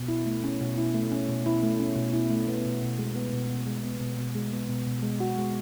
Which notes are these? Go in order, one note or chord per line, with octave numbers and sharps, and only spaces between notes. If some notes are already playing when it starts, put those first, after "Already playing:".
Already playing: B2
E4
A3
C#4
B2
E4
A3
C#4
B2
E4
A3
C#4
B2
E4
A3
B3
B2
B2
G#3
B3
B2
B2
G#3
B3
B2
B2
G#3
B3
B2
B2
G#3
F#4
G#3